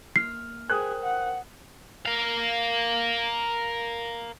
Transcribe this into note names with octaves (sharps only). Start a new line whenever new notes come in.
A#3 F6 C7
G#4 A#4 C5 G5 D#6 F#6
F#5
A#4 F5